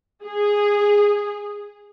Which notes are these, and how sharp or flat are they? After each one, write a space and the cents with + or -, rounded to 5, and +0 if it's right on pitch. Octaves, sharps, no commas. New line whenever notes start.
G#4 -10